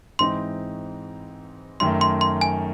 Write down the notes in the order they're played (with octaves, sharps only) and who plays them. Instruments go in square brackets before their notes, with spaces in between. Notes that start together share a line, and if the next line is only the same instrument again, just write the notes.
[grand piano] G#2 E3 C4 D#4 [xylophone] C6
[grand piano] F#2 D#3 A3 [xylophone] C6
[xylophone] C6
C6
G#5